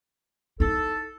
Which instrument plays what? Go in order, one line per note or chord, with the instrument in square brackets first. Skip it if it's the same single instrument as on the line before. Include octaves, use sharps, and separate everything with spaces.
[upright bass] D#4 E4 [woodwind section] A4